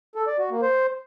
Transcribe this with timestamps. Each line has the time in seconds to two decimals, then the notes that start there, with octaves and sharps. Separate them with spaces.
0.15 A4
0.27 D5
0.39 F#4
0.50 A#3
0.62 C5